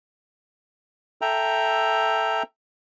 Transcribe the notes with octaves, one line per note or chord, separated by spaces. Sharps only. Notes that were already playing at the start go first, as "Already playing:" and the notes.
A4 E5 G5 A#5